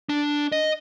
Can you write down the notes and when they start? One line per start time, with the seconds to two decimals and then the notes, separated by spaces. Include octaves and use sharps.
0.09 D4
0.52 D#5